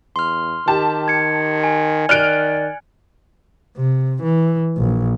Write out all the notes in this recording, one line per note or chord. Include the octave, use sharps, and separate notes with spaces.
E2 C6 F6
D#3 G4 A5
G#6 C#7
G#5
D#3 D5 F6 F#6 D7
C3
E3
A#1